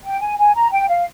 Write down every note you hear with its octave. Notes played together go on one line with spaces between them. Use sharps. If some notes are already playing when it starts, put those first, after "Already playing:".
G5
G#5
G#5
A#5
G5
F5